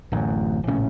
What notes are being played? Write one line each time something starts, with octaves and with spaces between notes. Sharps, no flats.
D1 A1 F#2
A#1 A2 C#3 C#4